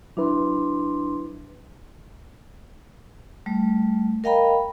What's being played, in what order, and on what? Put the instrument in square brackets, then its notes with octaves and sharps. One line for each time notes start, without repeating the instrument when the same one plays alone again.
[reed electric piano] F#3 E4 B4 [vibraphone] D4 C6
[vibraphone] G3 A3
A#4 D#5 F5 G5 A#5 B5